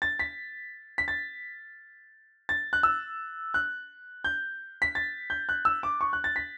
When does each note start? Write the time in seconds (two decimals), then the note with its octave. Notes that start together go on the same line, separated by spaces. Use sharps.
0.02 A6
0.19 B6
0.98 B6
1.08 A6
2.49 A6
2.73 F#6
2.83 E6
3.54 F#6
4.24 G6
4.82 B6
4.95 A6
5.30 G6
5.49 F#6
5.65 E6
5.83 D6
6.01 C#6
6.13 F#6
6.24 A6
6.36 B6